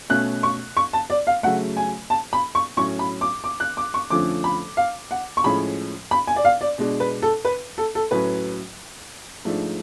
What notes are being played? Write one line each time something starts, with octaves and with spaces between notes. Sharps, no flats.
B2 A3 C#4 F#6
C#6
C#6
A5
D5
F5
C#3 F#3 A3 F#5
G#5
A5
B5
C#6
A2 F#3 C#4 C#6
B5
D6
D6
F#6
D6
C#6
F2 D3 F3 A3 C#4 D6
B5
F5
F#5
C#6
A2 F3 G#3 C#4 B5
B5
G#5
D5
F5
D5
B2 G#3 D4
B4
A4
B4
A4
A4
A2 F#3 C#4 B4
G#2 F3 A3 D4